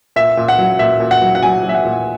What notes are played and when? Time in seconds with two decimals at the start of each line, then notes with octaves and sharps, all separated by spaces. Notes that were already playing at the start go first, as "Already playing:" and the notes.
0.16 A#2 E5
0.37 A#2
0.48 F#5
0.58 F#3
0.79 A#2 E5
1.00 A#2
1.11 F#5
1.22 F#3
1.35 F#5
1.43 F#3 G#5
1.63 F#3
1.69 E5
1.75 F#5
1.85 A#2